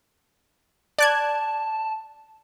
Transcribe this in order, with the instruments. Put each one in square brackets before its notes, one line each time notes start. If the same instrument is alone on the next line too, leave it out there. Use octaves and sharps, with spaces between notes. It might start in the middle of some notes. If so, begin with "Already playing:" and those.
[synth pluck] D5 F#6 G#6 [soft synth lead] A5